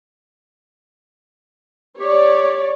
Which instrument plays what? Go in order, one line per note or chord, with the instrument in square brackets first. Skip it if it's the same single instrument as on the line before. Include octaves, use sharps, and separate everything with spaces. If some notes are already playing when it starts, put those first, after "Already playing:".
[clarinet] G4 [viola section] C#5 D5